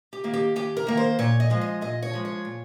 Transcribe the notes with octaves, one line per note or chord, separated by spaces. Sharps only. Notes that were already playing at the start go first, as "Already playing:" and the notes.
G4
D#3 A#3
G4
D#2 G4
A#4
D#3 A#3
C5
A#2 C#5
D#5
F3 G#3
D#5
A#2 D#5
C#5
F3 G#3
C#5
A#2